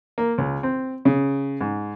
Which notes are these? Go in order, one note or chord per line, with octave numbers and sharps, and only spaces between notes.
A#3
C#2
C4
C#3
G#2